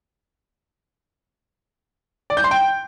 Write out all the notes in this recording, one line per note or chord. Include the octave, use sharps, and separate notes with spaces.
D5
G6
C6
G5